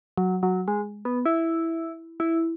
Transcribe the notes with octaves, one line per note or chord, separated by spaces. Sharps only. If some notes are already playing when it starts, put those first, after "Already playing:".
F#3
F#3
G#3
B3
E4
E4